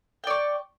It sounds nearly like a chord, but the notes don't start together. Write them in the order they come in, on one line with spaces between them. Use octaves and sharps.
G5 D5 C#6